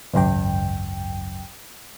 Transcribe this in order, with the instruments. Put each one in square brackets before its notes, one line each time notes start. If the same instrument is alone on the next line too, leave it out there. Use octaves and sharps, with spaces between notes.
[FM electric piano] G#1 C#2 F#2 G5